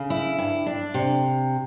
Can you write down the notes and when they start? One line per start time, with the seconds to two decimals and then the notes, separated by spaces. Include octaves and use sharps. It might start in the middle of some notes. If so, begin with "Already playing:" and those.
Already playing: C#3
0.10 E4
0.38 G2
0.66 D4
0.94 C3